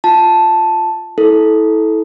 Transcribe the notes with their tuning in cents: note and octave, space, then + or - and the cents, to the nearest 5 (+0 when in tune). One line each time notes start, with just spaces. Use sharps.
F4 +5 A5 +0
E4 -25 A4 -15